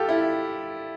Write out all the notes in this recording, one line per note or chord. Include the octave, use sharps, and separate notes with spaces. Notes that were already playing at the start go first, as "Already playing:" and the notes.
Already playing: F4 G4 A4
E4